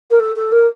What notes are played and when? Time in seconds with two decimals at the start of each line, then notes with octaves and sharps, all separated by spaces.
0.10 A#4
0.20 A4
0.36 A4
0.52 A#4